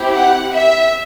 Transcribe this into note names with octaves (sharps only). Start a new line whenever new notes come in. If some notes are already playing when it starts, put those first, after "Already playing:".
Already playing: C4 E4 G4
F#5
E5